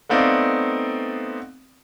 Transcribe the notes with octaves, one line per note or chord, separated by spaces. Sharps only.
A3 B3 C4 D#4 D5 F5